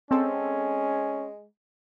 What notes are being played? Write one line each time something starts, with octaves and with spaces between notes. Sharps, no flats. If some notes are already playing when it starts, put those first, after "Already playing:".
G#3 C4 C#4 A4